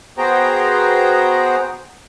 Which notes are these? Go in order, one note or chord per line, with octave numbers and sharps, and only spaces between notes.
B3 F#4 G#4 C5 G5 A#5